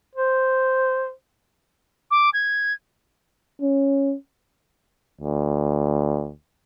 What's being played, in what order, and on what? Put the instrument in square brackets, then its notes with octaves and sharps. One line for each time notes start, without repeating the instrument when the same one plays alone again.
[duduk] C5
[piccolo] D6
G#6
[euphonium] C#4
D2